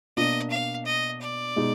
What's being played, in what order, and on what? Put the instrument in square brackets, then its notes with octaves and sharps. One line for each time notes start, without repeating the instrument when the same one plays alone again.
[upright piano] B2 A#3 D4 [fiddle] D#5
[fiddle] F5
D#5
D5
[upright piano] B2 G#3 D#4